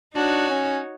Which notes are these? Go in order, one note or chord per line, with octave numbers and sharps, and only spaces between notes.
D4 D#4 F#4 C#5
C#4